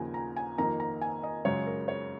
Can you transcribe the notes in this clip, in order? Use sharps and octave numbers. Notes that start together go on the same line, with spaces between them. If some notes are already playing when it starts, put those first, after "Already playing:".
Already playing: D#2 C#3 F3 A#4 G#5
A#5
G#5
F2 D#3 A#3 A#5
A#5
G#5
D#5
F#2 C#3 G#3 C#5
A#4
C#5